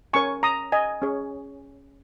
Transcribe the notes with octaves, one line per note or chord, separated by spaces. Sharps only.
C#4 A#4 C#5 G#5 C#6
A#5 D#6
D#5 G#5
C#4 G#4 C#5